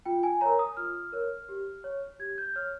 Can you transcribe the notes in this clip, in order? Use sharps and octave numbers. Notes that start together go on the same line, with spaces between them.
F4 G5
G#5
A#4 C#5 A#5
D#6
F4 F6
A#4 C#5
G4
C#5
G4 G#6
G6
C#5 F6